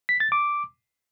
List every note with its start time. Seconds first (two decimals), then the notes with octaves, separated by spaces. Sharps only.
0.09 B6
0.20 A6
0.32 D6